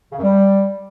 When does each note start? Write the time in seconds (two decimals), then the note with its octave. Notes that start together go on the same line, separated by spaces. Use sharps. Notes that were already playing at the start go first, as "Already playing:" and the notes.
0.12 C#3
0.18 F#2
0.23 G3